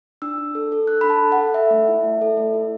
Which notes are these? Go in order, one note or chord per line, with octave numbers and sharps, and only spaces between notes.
D4 E6
D4
A4
A4
D4 F#6
D4 B5
A5
A4
F#5
A4
A4 E5
A3
E4
A3
A4
A3
E4